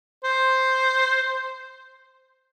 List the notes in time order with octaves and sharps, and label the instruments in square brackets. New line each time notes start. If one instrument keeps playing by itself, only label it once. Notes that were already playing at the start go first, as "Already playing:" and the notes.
[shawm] C5